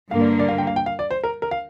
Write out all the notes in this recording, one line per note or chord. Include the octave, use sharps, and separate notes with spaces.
G2 D3 A#3 F5
D5
D5
F5
G5
F5
G5
F5
D5
C5
A#4
A#4
F5